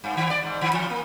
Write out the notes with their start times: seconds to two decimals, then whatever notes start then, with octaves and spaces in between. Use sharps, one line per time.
0.04 G2
0.17 D#3
0.30 D5
0.43 G#2
0.61 D#3
0.73 E3
0.90 A#3